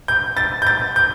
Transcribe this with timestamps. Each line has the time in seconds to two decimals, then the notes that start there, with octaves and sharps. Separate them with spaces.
0.08 G6
0.37 A6
0.62 G6
0.67 A6
0.96 G6